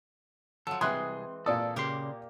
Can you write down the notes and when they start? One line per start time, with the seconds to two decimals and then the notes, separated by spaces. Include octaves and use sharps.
0.67 F3 F#3 A4
0.81 C2 E3 G#3 C4 G#4 C6 F#6
1.46 A#2 A4 D5 D#6
1.76 C#3 A#3 G4 C6